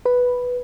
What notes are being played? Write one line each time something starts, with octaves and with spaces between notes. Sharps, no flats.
B4